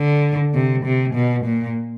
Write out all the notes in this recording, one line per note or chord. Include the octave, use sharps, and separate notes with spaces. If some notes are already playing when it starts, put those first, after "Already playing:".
Already playing: D3
C3
C3
B2
A#2